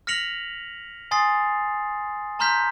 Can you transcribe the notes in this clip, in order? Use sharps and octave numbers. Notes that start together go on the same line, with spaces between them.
F6 A#6 B6 C#7 F7 F#7
G#5 C6 D#6 A6 C7
A5 A#5 C6 F6 G6 B6